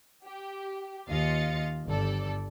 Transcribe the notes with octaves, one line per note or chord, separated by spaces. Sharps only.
G4
D#2 F4 D#5 F5 A6 C#7
G1 G3 A4 D5